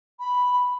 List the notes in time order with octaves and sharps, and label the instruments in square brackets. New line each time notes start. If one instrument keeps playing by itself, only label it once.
[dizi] B5